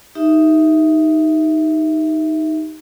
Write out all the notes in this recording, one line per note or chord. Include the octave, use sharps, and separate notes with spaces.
D#4 G4 E5